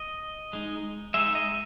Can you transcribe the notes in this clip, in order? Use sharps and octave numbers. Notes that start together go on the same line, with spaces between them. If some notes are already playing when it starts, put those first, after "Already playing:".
Already playing: D#5
G#3 D#4
G#3 D#4 E5
D#5